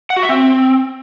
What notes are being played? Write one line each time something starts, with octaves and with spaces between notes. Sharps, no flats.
F#5
F#4
E5
C4